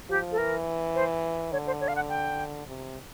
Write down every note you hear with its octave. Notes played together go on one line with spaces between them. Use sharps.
F3 G4
A4
E3 A#4
C5
D3 C#5
C5
C#5
F5
F#5
G5
C3